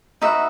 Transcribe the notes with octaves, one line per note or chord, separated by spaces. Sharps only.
D#4 F#4 B4 E5